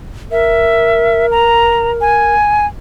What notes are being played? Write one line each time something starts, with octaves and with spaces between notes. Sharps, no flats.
A#4 E5
A#5
G#5